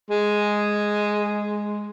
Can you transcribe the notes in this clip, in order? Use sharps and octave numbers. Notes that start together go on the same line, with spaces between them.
G#3